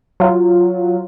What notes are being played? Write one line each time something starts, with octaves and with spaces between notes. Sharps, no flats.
F#3 F4